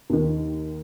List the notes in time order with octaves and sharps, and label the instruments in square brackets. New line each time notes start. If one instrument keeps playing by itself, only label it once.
[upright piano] D#2 D#3